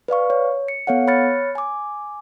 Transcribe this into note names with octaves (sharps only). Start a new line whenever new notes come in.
B4 D5 F5 C#6
C#5
C#7
B3 A4 C#5 F5 F#5
C#5 B5 F6 F#6 A6 C#7
G#5 D6